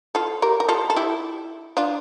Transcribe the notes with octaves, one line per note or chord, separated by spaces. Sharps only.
F4 A4
G4 A#4
A#4
F4 A4
A4
E4 G4
D4 F4